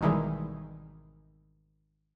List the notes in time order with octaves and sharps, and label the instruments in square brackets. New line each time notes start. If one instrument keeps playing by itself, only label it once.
[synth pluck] G#1 B2 D#3 E3 G3 G#3